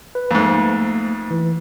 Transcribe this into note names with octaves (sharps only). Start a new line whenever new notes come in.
B4
F2 G#2 A3 A#3
E3